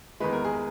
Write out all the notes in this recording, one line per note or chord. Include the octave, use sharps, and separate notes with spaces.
E2 D#3 G#3 B4
A#4
G#4